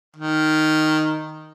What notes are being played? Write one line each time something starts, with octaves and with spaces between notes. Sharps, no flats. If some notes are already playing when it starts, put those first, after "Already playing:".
D#3